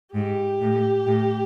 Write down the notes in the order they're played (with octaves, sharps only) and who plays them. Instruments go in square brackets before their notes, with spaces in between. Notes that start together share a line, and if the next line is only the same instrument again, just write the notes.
[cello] G#2 [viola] G4
[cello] A2
A2